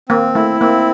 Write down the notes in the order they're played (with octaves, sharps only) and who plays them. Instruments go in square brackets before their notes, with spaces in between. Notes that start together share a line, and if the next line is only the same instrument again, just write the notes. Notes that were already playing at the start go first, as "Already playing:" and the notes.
[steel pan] A#3 [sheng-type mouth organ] C4
[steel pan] A3 [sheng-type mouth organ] E4
[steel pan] A#3 [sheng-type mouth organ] C4